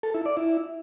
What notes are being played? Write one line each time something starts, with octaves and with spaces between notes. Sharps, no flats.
A4
E4
D5
E4